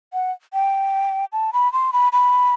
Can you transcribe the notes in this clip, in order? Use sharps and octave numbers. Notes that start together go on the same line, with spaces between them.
F#5
G5
A5
B5
C6
B5
B5